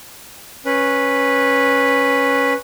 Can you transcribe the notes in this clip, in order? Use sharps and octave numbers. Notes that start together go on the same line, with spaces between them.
C#4 B4